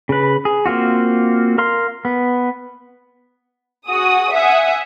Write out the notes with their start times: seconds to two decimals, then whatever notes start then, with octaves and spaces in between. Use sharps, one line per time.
0.09 C#3 B4
0.45 G#4
0.66 A#3 C4 F4 F#4
1.58 A#4 F5 C6
2.05 B3
3.88 F#4 G#4 D#6
4.32 E5 F#5 G#5 D#6